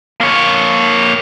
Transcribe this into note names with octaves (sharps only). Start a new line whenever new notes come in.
A#3 C#5